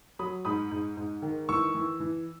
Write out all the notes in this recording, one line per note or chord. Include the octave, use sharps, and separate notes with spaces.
F#3 B5 D#6
G#2 B5 D#6
G#2
G#2
D#3
E3 C#6 E6
E3
E3